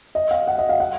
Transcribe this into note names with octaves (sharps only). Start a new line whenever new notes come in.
D#5
F5
F#5
D#5
F5
F#5